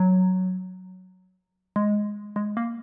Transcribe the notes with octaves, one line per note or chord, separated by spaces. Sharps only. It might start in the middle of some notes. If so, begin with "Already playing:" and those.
Already playing: F#3
G#3
G#3
A#3